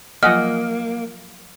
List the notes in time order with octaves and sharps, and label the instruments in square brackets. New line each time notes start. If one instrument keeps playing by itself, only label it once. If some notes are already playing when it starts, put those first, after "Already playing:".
[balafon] F3 F#3 F4 [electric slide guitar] A#3 [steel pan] D#5 F#5 G#5 [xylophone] F6